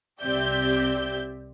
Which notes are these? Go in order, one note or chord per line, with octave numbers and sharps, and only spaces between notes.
C2 C4 G4 D5 E5 G6